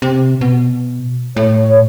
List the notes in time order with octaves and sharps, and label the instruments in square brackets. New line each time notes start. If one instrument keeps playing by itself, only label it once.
[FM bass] C3
B2
[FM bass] A2 [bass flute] C#5